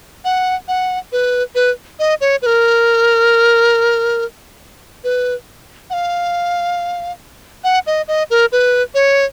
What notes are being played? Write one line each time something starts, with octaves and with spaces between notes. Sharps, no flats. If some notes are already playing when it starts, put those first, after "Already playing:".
F#5
F#5
B4
B4
D#5
C#5
B4
A#4
B4
F#5
F5
F#5
D#5
D#5
A#4
B4
C#5